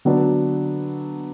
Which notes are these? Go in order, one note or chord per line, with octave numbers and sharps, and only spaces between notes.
D3 F#3 B3 D4